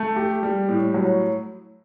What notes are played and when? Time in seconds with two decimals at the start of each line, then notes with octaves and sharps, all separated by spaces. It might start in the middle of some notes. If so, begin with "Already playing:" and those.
Already playing: A3
0.16 G4
0.43 G3
0.68 A2
0.94 F#3